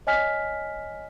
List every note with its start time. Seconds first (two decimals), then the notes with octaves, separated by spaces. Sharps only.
0.07 C#5 D#5 G#5 F6 B6